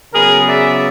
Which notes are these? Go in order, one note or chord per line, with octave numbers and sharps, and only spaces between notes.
C#3 F#3 B3 G#4 A#4
D5 E5